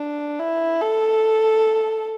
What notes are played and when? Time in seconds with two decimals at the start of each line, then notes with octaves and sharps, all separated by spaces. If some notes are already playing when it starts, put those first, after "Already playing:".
Already playing: D4
0.39 E4
0.82 A4